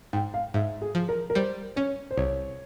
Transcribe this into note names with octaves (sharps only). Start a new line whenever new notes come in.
G#2 G5
F5
G#2 E5
G#4
F3
A#4
A#4
G3 C5
C#4 C#5
C5
C2 C#5